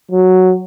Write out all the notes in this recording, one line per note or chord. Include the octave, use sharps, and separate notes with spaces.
F#3